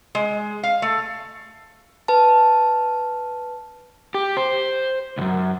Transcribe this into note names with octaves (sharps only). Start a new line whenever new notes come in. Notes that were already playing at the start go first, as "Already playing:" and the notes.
G#3
F5
A3
B4 A5
G4
C5
C2 F#2